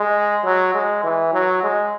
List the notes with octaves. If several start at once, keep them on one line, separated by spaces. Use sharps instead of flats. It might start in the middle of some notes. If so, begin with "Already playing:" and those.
Already playing: G#3
F#3
G#3
E3
F#3
G#3